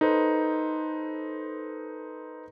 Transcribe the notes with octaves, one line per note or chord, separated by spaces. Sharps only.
D#4 A4 B4 C5